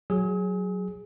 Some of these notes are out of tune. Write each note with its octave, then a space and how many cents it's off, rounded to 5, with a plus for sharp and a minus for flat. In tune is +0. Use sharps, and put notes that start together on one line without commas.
F#3 +0 G#4 +0 D#6 +45